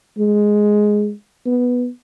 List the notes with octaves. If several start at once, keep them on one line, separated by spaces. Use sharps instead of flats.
G#3
B3